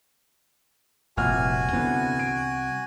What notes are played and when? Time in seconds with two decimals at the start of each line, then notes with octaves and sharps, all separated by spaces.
1.17 F1 C2 A#2 F#4 G#5 F6
1.73 C2 D3 E3 B3 C4
2.19 D7